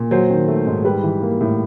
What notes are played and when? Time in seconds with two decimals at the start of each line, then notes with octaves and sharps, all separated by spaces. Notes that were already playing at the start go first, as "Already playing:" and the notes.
Already playing: A#2
0.11 F#3 C5
0.30 D#3
0.48 A3
0.67 G#2
0.85 G3 B4
1.04 E3
1.22 A#3
1.41 A2